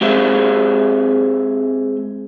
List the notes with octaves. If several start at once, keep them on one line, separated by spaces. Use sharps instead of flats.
G#3 C4 G4 G#4 C5 E5